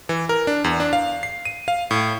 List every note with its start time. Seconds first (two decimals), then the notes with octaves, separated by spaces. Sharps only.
0.09 E3
0.29 A#4
0.47 D4
0.64 E2
0.80 D4
0.93 F5
1.23 C7
1.45 D#7
1.68 F5
1.91 A2